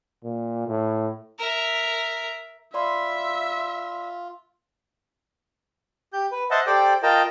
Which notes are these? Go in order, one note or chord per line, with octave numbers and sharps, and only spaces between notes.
A#2
A2
A#4 E5
F4 D5 E5 B5 C6
G4 G6
B4
C5 D#5 E5 F#5 A5
G4 A4 C5 D5 G5 D6
F4 A#4 D#5 G5 A5